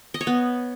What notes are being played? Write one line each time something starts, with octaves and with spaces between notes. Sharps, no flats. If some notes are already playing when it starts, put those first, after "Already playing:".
D#5
C#5
B3